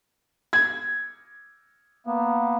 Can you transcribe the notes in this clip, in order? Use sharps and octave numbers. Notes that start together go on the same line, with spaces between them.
G#6
A#3 B3